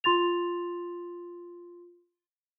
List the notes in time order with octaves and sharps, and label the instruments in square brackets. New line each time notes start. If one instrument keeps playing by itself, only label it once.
[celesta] F4 C6 A6 F7